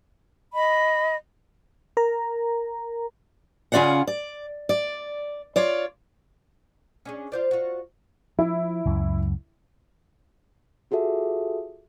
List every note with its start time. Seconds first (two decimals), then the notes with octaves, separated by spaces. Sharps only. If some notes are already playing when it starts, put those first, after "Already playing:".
0.53 D#5 B5
1.97 A#4 A#5
3.72 C#3 C#4 F4 D5 F5 F#5
4.07 D5
4.69 D5
5.56 F4 C#5 D5
7.05 C#4 D4 G#4
7.32 F4 C5 D5
7.51 F4 F#4
8.39 F3 E4
8.85 C#2 F#2
10.91 F4 F#4 G#4 A4 E5